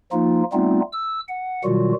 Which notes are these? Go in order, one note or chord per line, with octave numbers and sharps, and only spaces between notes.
F3 A#3 D#4 F4
G3 A3 B3 C4 D#4 F4
E6
F#5
B2 D#3 F#3 G3 F4 F#4